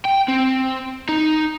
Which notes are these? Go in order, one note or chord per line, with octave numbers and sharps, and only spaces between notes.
G5
C4
D#4